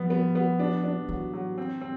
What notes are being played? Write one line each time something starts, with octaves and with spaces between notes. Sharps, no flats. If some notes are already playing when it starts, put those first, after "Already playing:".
Already playing: F3 G3 B3
B3
B3
D4
D4
E3 F#3
F#3
C4
C4